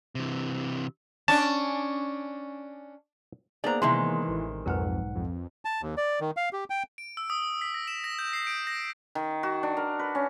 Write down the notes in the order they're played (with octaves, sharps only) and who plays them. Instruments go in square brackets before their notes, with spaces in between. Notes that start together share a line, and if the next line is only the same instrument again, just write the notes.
[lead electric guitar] C3 E3
[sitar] C#4 D4 [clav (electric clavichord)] A5
[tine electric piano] A#3 B3 G#4 [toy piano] D#4 C5 [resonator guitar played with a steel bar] D5 A#5
[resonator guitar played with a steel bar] C3 D#3 G#3 [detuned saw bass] E3 [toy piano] C6
[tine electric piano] A1
[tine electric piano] B1 G#2 F#5 [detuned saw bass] F2 [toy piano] A#4 B4
[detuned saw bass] F2
[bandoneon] A5
D#2
D5
D#3
F5
G4
G5
[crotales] D7
E6
D#6
F#7
B6
A#6
E7
A#6
G6
C7
D7
A#6
[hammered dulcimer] D#3
F#4
D4
A#4
B4
C#4